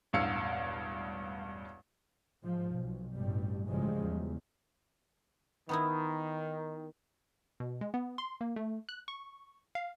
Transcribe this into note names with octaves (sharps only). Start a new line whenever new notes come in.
E1 A1 G2 F5 E6 C#7
G#2 F3
B1
A1 G2 B2 G3
A1 C#3 F3 G3 G#3
E2
D#3 B3 D#4 E4
B2
G#3
B3
C6
A#3
A3
F#6
C#6
F5